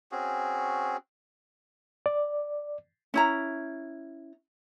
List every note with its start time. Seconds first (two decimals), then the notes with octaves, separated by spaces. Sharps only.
0.12 C4 C#4 F#4 G#4
2.06 D5
3.14 C#4 E4 A#5